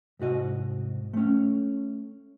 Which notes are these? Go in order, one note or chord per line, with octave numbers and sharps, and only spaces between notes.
C2 G#2 F#4 D#5
A3 C#4